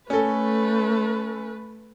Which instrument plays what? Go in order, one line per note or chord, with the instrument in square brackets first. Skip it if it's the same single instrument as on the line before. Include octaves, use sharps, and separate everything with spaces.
[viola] A3 B4 [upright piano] C#4 A4